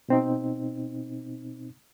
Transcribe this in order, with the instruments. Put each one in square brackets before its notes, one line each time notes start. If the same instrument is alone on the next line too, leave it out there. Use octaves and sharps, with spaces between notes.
[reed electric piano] B2 C4 D#4